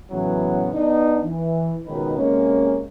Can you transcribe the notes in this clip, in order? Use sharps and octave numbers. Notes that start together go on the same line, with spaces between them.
A2 C#3 E3 F#3 B3 C#4
B3 D4 D#4
E3
C#2 B2 D#3 D#4 B4
C3 G#3 A#3 C#4